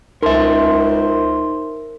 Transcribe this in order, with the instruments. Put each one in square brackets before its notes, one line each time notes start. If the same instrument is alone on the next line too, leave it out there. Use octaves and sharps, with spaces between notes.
[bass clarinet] C#2 [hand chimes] D#4 C6 [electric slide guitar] A#4 E5 [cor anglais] C5